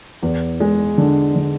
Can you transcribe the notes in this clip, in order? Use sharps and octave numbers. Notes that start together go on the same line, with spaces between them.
E2
G#3
D3
D3